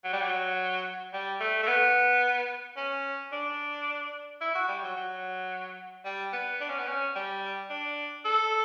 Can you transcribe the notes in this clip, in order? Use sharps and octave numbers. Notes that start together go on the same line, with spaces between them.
F#3
G3
F#3
G3
A3
A3
B3
C#4
D4
E4
F#4
G3
F#3
F#3
G3
B3
D4
C#4
B3
C#4
G3
D4
A4